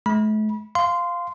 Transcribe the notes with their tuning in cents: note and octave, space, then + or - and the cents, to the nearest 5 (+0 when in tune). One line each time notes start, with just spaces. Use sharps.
A3 -40 B5 -30
F5 +0 C6 -15